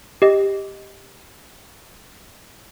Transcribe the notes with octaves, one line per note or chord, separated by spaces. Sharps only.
G4 D#5